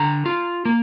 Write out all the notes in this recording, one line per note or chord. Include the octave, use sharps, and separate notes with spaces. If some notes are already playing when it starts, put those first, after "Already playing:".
Already playing: D3 A#5
F4
A#3